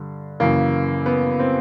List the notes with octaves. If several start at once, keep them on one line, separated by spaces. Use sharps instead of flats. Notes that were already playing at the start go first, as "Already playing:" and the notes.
Already playing: G2 D3
F#2 C#3 E3 A#3
B3
C4